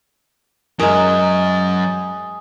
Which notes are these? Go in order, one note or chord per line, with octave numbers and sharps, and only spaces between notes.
F#2 F#3 G#3 A#4 G#5 D#6